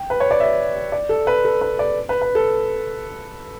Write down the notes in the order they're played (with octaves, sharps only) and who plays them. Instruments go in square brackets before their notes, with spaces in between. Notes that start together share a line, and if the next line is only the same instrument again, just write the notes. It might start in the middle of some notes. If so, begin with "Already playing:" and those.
Already playing: [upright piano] G5
B4
C#5
D5
E5
D5
A4
B4
A4
B4
D5
B4
B4
A4